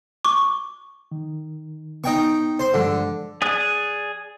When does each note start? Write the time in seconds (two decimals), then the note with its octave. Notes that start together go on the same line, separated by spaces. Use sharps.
0.25 C#6 D6
1.11 D#3
2.04 B3 D#4 G5 C#6
2.59 C5 C6
2.74 G2 D3 F3 G#3
3.42 G#4 D5 D#6 F#6